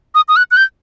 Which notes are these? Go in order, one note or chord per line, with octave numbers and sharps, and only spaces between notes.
D#6
D#6
F#6
F#6
G6